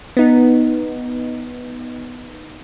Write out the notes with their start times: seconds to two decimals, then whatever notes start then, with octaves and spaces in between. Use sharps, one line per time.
0.17 B3 D#4